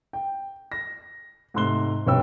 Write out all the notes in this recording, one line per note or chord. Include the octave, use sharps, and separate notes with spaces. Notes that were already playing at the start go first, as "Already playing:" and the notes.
G5
A#6
G#2 C3 A3 C6 F#6 G7
B1 G2 C3 C#5 G5 E6